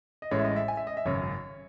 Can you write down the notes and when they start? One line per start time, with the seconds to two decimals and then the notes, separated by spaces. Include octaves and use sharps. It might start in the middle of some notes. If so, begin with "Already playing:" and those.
0.22 D#5
0.31 A1 A2 G#3 C#4 C#5
0.39 E5
0.44 D#5
0.56 E5
0.68 G#5
0.77 E5
0.87 D#5
0.97 E5
1.05 G#1 F#2 C#3 C#5